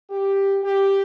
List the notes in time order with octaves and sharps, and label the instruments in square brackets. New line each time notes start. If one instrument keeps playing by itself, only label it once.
[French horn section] G4
G4